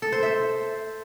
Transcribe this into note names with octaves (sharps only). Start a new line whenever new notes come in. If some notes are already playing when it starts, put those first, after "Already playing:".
A4
C5
E5